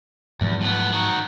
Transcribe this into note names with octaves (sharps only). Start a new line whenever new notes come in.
E2 G#2 F3 F#3
A2 B3
D#3 F#4